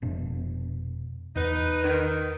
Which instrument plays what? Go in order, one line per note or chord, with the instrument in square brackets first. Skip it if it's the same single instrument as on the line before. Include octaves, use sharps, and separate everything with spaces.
[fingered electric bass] F1 B2 D4
[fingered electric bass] E2 [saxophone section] D#4 B4
[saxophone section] D#3